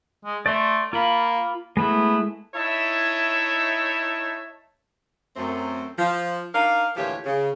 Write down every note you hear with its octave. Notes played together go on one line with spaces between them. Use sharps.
G#3
A3 D5 C6
A#3 F4 B5
G#3 A3 B3 E4
D#4 E4 C#5 E5 A5
F#2 A3 C4
F3
D4 D#4 A#4 F5
D2 A#2 E3 F3 G4 C#5
C#3